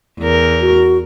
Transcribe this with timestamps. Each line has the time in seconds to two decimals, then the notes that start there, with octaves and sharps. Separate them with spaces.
0.19 E2 A#4
0.61 F#4